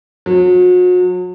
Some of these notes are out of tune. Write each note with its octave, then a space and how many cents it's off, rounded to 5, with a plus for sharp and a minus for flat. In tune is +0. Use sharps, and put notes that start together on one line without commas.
F#3 -40